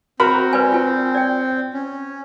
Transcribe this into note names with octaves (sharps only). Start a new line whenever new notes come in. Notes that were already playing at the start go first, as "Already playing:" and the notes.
C4 F#4 A#4 B5
B4 D5 G#5
F4 G#5
D5 G5
C#4